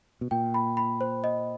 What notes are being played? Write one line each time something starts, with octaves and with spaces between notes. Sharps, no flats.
B2
A#2 G5
B5
B5
C5
D#5